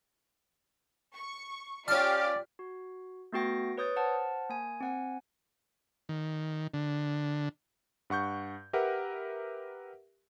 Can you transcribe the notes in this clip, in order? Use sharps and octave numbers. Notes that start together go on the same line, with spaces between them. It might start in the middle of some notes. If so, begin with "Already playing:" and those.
C#6
C#4 F4 G4 D5 A5 D6 F6
F#4
A3 B3 F#4 G5 A#6
B4 C#5 D#6 G6 A6
C5 F#5 A5 F6
A#3 G#5
C4 F#5 G#5
D#3
D3
G2 F#5 C#6 G6
G4 A#4 B4 E5 F#5